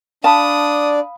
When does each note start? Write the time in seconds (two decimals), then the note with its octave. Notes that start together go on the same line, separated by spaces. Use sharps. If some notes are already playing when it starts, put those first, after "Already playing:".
0.24 D4 D5 F5 A5 B5 D#6